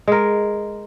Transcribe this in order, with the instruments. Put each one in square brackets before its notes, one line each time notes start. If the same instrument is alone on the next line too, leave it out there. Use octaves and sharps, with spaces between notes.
[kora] G#3 A#4